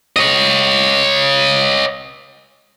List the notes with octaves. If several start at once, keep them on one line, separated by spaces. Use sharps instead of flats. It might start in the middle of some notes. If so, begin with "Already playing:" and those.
C#5 D#5